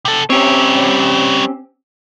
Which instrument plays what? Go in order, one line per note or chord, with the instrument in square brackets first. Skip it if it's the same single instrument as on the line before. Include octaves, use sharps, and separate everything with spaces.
[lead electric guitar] C3 A4
[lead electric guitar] G3 C#5 [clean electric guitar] C4 C#4 G4